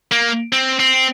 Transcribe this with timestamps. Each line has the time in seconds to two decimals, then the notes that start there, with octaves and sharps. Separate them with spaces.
0.12 A#3
0.53 C4
0.80 C4